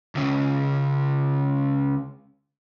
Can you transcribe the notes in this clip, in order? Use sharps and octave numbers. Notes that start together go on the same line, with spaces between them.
C#2 C#3